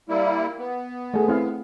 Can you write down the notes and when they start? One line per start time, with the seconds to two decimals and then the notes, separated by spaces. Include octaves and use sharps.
0.09 G3 A#3 E4
0.59 B3
1.14 A3 G#4
1.28 C4 E4 F5